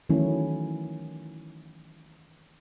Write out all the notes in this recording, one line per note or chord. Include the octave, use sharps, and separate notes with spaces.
D#3 E3 F#3 A3 C#4 E4